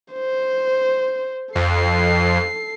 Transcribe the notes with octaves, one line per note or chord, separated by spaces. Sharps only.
C5
F2 A4 C7